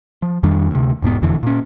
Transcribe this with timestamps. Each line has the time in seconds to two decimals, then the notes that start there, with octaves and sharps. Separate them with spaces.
0.22 F3
0.43 F2 D#3 G3 D4
0.71 D2 C3
1.02 E1 G#2 A#3 B3
1.22 E1 F2 D3 E3
1.43 A#2 C#4